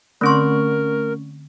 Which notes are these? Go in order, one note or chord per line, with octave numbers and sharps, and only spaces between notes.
D3 A3 C4 C#4 A#4 C6 C#6